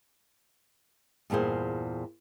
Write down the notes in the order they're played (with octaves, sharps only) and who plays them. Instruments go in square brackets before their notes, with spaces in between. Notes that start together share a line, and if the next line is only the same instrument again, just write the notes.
[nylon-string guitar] E2 G2 A#2 G#4 C5